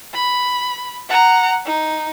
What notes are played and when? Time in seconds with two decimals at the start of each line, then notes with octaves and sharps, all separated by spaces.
0.14 B5
1.09 F#5 A#5
1.66 D#4